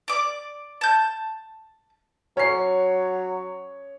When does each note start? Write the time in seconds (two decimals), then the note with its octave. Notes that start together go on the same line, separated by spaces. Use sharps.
0.08 D5 D6
0.81 A5 G6
2.37 F#3 C#4 C#5 C7